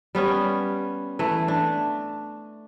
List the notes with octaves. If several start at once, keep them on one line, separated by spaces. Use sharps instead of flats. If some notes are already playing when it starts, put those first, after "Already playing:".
G3 B3 C#4
E3 A3
D4